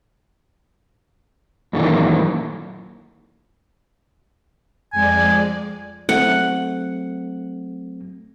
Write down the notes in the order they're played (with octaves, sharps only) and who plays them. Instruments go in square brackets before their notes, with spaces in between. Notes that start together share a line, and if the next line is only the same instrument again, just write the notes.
[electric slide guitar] F#2 A#2 D#3 E3
[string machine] F2 G#3 D5 [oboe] G#5
[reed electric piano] F#3 A3 C4 [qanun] F#5